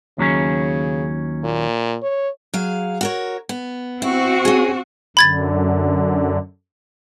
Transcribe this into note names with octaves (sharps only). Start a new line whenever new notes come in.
D#2 C#3 F#3 C#4
A#2
C#5
F#3 G#4 F5
F#4 A#4 C#5
B3
C4 E4 F#4
C#4 G#4
F#2 D3 B5 G#6 A6